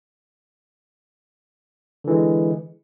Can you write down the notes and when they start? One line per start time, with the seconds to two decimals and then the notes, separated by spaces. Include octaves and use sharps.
2.04 D3
2.07 E3
2.10 G#3